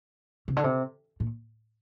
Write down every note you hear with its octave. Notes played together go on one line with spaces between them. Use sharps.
C3
D3
C3
A#2